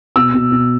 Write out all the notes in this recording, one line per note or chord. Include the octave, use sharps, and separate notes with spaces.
B2 E6
B2
B2